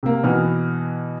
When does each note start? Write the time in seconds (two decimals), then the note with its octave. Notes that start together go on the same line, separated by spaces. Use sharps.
0.03 C3 A#3
0.23 B2 E3 B3 F#4 F6